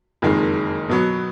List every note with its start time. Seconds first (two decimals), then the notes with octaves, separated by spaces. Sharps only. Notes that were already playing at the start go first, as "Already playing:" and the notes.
0.22 F#1 F2 D#3 G#3
0.90 B2 F#3 B3